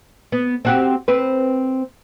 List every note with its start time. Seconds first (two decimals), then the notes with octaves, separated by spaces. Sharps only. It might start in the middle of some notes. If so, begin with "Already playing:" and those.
0.32 B3
0.65 C4 F#4 G4
1.08 C4 B4